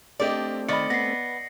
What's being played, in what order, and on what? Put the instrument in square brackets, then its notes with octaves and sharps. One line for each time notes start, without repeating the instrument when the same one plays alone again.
[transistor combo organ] A3 C4 [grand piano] D4 G4 D#5 [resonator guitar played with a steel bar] D5
[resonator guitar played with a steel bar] D#3 [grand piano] D5 D#5 B5 [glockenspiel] C#7
[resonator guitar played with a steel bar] B3 [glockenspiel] A#6 C7